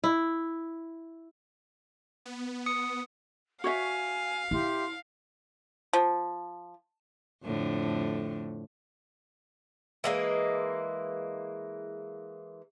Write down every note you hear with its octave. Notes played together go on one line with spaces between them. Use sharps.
E4
B3
D#6 C#7
F#4 C#5 E5 F5 G#5
E4 G4 E5 C6
F3
F2 A2 D3
E3 G#3 A#3